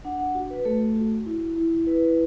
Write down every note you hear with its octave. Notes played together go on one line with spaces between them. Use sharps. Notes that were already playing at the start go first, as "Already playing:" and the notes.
D4 F#5
F#5
F#4
B4
A3 A4
F#4
E4
E4
E4 B4